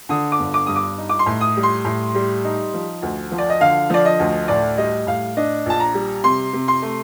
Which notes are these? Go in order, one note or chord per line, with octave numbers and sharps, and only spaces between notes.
D3 D#6
D6
G1
D6
G2 D#6
D6
D#4
D6
C6
A2
D#6
G3
C6
A2
G3
D#4
F3
D2
F3
D5
D#5
D3 F5
F3 D5
D#5
D2
A2 D5
G3 D#5
A2 F5
D4 D#5
A#1 A5
A#5
G3
C3 C6
C3
C6
A3